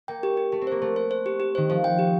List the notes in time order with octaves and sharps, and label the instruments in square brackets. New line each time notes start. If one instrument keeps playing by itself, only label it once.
[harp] A#3 [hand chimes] G5
[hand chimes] G4
G4
[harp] A3 [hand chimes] G4
[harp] C4
[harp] A#3 [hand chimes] C5
[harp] A3 [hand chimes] C5
[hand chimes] C5
C5
G4
G4
[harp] D#3 [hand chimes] C5
[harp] F3 [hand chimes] C5
[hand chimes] G5
G4